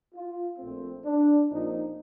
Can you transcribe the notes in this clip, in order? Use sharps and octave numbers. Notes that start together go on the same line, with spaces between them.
F4
A#1 A#2 F3 A3 C4
D4
A#1 A#2 F3 C4 D#4